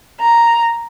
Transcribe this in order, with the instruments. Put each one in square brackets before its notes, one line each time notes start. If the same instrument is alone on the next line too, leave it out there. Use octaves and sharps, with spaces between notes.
[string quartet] A#5